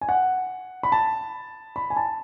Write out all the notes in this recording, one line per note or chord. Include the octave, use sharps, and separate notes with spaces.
G#5
F#5
B5
A5
B5
G#5
A5